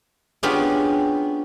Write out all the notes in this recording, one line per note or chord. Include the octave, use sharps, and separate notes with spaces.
B3 C#4 D4 F4 G4 G#4